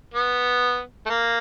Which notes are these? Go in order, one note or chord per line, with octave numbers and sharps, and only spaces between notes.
B3
A3
A#3